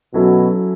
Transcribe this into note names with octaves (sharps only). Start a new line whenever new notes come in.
B2 F#3 C#4 E4 A4